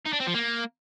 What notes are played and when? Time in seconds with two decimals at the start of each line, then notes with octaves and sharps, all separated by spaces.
0.06 D#4
0.13 D4
0.20 C4
0.27 F3
0.35 A#3